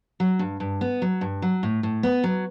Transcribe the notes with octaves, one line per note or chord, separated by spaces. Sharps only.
F#3
G2
G2
B3
F#3
G2
F#3
A2
A2
B3
F#3